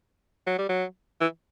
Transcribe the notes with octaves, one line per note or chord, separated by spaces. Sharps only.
F#3
G3
F#3
E3